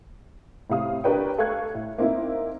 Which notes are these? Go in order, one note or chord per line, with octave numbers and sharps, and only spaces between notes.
A2 C3 F5 D#6
D4 G4 A#4 B4 C#5 G5
A4 F5 C#6 F#6 G#6
A2
A#3 C4 D#4 E4